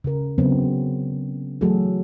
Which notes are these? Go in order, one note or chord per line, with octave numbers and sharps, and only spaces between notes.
C#3 A#4
C#3 F#3 B3 C4
E3 F#3 A3 F#4 G#4 A4